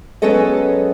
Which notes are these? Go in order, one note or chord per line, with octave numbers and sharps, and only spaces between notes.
F#3 G#3 B3 C#4 A4 D#5